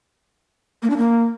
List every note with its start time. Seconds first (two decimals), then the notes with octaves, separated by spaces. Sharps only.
0.82 A#3
0.90 D4
0.97 A#3